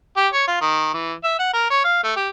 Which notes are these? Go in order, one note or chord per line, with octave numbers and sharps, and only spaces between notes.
G4
C#5
F4
D#3
E3
E5
F#5
A#4
C#5
F5
A3
G4